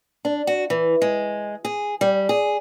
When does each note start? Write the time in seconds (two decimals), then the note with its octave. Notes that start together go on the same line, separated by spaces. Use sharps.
0.25 D4
0.47 F#4
0.70 E3
1.02 G#3
1.65 G#4
2.01 G3
2.29 G#4